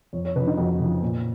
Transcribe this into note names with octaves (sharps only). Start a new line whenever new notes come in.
F2 C#5
C#5
C#3 F3 B4
D#4
F2 F#4
C#3 F3
A#2